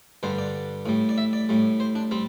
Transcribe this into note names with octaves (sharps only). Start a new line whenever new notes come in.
G2 D3 G3 C5
D5
A2 G3
D5
E5
D5
A2 G3
C5
D4
G3 C4